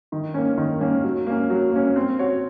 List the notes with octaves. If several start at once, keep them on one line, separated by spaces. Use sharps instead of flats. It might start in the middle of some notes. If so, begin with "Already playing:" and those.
D#3
A#3 C#4
D#3
A#3 C#4
F#3
A#3 C#4
F#3
A#3 C#4
C4
F#4 C#5